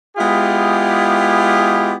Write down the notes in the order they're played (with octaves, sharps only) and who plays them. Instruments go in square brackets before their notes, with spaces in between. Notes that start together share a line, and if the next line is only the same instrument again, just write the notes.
[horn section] G#3 B3 E4 F4 G4 G#4